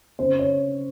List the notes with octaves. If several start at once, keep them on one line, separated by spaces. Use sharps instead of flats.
C#3 C5
C#5